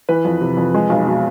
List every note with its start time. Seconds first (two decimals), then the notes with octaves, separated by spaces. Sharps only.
0.09 E3 B4
0.25 F2
0.41 C3
0.57 F2
0.74 G#3
0.90 B1
1.07 B2